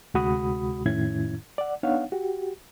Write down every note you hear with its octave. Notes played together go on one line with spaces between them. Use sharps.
D2 C3 G#3 F#4 B5 D#6
F2 A2 D#3 C#4 E4 G#6
D5 F#5
B3 D4 D#4 C#5 F5 F#5
F#4 G4